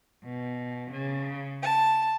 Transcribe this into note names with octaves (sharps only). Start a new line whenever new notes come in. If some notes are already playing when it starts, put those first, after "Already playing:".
B2
C#3
A5